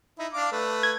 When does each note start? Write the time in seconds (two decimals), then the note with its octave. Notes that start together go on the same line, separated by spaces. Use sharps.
0.19 D#4 E4
0.33 D4 F5 D6
0.52 A3 B4
0.83 G#6